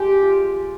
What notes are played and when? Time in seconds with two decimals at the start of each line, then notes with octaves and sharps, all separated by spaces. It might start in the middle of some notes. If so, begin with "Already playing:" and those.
Already playing: G#3 G4
0.22 F4